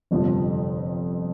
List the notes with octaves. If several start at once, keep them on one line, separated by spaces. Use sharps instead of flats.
G1 F2 C3 F3